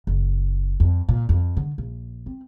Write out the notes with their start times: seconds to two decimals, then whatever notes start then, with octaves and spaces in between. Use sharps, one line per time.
0.07 F#1
0.80 F2
1.09 A#2
1.29 F2
1.57 D3
1.78 A#1
2.26 C4